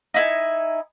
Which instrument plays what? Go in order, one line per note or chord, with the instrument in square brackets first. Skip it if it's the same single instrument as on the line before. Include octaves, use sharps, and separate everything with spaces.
[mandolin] D#4 E4 G#5